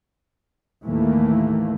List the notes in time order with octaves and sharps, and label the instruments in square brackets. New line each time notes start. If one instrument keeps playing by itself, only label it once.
[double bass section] D#2 A2 E3 A3 A#3